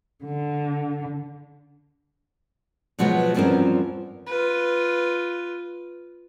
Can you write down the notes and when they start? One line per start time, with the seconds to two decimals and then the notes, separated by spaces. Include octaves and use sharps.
0.23 D3
2.99 B2 F3 F#3 G#3 B3
3.34 E2 G2 F3 C4 C#4 A#4
4.27 F4 B4